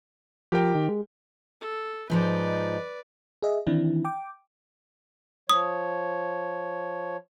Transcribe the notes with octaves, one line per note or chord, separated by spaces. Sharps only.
F3 G4 A#4 G5
D#3
G#3
A4
G#2 F3 D#4 B4 D5
G#4 D#5 E5
D#3 E3 C4 D4 E4
G5 D6
F3 C#5 D#6